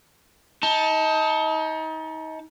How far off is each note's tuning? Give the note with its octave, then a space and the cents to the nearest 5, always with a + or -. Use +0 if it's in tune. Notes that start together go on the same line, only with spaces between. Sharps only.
D#4 +30 A5 +0